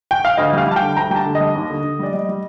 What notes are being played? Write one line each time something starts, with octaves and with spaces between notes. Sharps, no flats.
G5
F5
D2 D#5
G3
F5
G3 A5
G5
D3
D2 A#5
G3 G5
A5
D3
D#5
G3
D#2
D3
D3
G3 D5
G3 D#5
G3